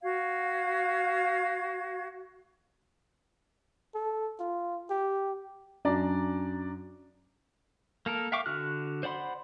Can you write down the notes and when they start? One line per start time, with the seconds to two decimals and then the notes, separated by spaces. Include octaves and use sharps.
0.02 F#4 F5 G#6
3.95 A4
4.39 F4
4.90 G4
5.85 F#2 D4 D5 A#5
8.06 A#3 A4 A#4
8.32 E5 F5 G5 C#6 D6
8.46 D3 F#4 F6 F#6
9.03 C5 D5 F#5 B5 C6